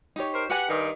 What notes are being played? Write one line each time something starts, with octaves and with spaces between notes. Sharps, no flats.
D#4 G4 C#5
A#4 C5
G4 B4 F#5 G#5
G2 D#3